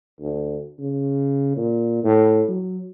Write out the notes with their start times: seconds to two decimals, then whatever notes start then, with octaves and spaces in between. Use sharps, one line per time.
0.21 D2
0.80 C#3
1.57 A#2
2.04 A2
2.49 F#3